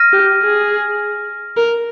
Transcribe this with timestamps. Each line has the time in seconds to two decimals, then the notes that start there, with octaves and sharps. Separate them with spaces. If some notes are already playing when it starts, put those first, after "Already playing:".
Already playing: F6 A#6 D#7
0.12 G4
0.42 G#4
1.56 A#4